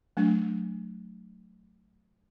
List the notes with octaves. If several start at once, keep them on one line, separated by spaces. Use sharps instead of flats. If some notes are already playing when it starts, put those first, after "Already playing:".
F#3 A3 D4